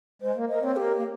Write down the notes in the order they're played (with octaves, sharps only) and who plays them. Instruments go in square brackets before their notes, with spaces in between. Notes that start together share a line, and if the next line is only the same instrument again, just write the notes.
[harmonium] G#3 [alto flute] C5
[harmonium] A#3
[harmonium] A#3 [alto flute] D#5
[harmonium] C4 [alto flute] C#5
[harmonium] A#3 [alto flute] G4
[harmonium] A#3